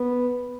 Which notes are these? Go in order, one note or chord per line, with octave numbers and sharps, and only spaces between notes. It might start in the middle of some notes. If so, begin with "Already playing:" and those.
Already playing: B3